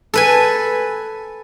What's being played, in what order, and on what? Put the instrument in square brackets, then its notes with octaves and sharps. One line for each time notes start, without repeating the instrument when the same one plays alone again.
[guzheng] A4 B4 G#5